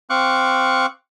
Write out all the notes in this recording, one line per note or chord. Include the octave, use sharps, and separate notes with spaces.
C4 F5 C#6 D6 F#6